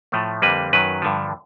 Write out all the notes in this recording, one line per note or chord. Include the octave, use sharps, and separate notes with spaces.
A2 F3 A3
F2 D3 G3 A#3 B4
F#2 D#3 F#3 B4
G2 D3 F3